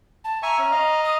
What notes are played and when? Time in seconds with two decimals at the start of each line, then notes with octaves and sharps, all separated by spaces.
0.25 A5
0.43 E5 G#5 A#5 C#6
0.59 C#4
0.72 D#5 F5
1.04 D#6